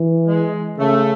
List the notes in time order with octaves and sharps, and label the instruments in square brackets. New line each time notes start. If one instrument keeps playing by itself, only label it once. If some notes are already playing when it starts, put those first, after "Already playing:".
Already playing: [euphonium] E3
[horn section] G#3
[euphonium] C#3 [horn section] A3